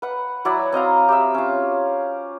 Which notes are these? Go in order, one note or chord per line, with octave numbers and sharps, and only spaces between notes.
B4 F#5
F#3 E4 D5 F#5
C4 D#5 F5 A#5
G4 E5
C#4 F4